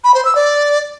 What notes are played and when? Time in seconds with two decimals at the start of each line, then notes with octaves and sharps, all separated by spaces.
0.04 B5
0.14 C5
0.25 E6
0.35 D5